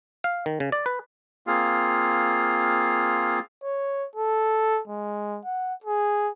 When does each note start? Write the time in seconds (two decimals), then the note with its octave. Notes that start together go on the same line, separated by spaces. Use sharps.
0.24 F5
0.46 D#3
0.60 C#3
0.72 D5
0.86 B4
1.47 A#3 C4 F4 G#4 F5
3.64 C#5
4.16 A4
4.88 G#3
5.45 F#5
5.84 G#4